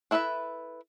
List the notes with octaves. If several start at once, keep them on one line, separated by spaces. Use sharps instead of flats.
D4 E4 A4 B4 E5